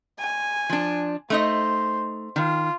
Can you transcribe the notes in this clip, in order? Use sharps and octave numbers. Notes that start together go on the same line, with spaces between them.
G#5
F3 D4
A3 D#4 C5 D#5
D#3 F4